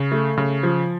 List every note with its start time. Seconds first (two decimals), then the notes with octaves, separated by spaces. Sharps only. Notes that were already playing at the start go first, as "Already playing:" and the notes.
Already playing: C#3
0.12 A3
0.37 C#3
0.63 F3